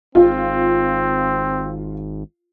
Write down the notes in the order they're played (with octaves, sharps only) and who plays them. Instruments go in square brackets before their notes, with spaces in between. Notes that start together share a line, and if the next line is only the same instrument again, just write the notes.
[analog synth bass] G#1 [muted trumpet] C4 [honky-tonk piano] F4